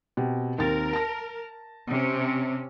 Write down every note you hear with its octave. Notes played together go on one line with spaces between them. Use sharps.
B2 C4 G4
D#2 C4 A#4 A6
A5 A#6
C3 C#4